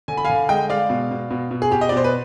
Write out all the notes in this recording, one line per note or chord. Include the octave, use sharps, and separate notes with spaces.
D3 G#5
B5
D3 F5 G#5
G#3 D#5 G5
G#3 D5 F5
B2
B2
B2
B2
G#4
B2 G4
D#5
D5
B2 C5
B4